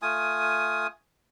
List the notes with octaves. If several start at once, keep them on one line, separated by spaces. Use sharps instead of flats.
A3 F4 G#5 D#6